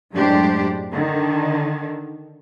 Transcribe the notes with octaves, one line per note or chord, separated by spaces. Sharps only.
F#2 A2 G#3 D4 G4 C5
D3 D#3